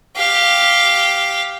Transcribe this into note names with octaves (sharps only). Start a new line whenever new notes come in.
G4 F5